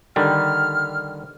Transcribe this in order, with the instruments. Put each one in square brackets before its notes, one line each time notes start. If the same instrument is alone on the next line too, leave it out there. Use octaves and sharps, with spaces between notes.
[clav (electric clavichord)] D3 D#3 G3 [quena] F6